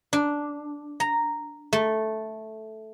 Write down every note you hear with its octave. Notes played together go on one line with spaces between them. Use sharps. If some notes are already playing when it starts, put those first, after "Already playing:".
D4
A#5
A3